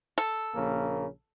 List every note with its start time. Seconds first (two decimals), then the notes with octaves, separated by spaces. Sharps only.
0.18 A4
0.55 A#1 C#3 A#3